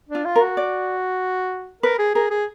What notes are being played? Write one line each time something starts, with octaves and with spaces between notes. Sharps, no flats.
D4
F4
F4
A#4
F#4
D5
A#4 B4
G#4
G#4 A#4
G#4